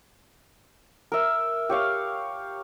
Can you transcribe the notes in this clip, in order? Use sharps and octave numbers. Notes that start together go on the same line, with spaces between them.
A#4 E5
G4 C#5 F5